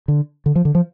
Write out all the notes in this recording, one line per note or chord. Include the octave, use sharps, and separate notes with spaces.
D3
D3
F3
D3
F3